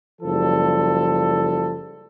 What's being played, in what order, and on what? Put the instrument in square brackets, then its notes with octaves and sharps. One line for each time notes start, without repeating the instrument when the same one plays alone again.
[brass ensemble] F#1 F3 G3 A4